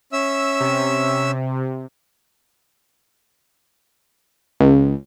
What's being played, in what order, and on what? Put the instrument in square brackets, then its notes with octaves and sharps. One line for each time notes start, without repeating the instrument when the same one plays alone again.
[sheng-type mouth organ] C#4 E5 E6
[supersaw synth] C3
[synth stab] C#2